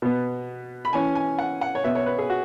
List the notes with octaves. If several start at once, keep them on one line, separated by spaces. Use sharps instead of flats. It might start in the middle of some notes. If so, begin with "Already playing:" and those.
B2 B3
B5
E3 C#4 G#5
G#5
F#5
F#5
C#5
B2 B3 E5
C#5
B4
G#4
F#4